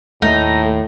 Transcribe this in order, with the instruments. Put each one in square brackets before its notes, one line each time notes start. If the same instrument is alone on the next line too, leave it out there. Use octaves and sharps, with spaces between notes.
[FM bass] D#2 [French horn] A2 [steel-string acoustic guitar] A3 [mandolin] D#4